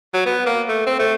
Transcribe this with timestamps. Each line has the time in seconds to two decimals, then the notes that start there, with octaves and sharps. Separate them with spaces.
0.14 F#3
0.26 B3
0.46 A#3
0.69 A3
0.87 C4
0.99 A3